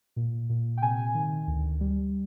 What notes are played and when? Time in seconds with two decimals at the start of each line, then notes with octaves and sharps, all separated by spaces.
0.16 A#2
0.50 A#2
0.77 G5
0.82 C3 G#5
1.15 D#3
1.47 D2
1.81 G3